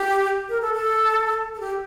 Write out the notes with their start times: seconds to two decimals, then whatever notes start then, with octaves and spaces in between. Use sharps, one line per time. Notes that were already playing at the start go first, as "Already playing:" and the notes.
Already playing: G4
0.49 A#4
0.62 A4
0.74 A4
1.55 A4
1.60 G4